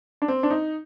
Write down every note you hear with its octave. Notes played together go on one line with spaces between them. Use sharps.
D4
C4
D4
D#4